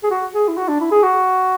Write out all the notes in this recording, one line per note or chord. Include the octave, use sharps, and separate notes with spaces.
G#4
F#4
G#4
E4
F#4
D4
E4
G#4
F#4